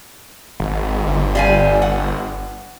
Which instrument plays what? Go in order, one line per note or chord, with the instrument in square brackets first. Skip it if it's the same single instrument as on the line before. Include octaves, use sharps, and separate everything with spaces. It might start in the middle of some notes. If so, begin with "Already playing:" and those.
[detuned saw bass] G#1
G1
[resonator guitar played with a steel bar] G3 F5 G#5
F#5